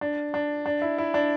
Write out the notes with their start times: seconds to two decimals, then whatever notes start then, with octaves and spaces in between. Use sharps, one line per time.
0.01 D4
0.34 D4
0.66 D4
0.82 E4
0.98 E4
1.14 D4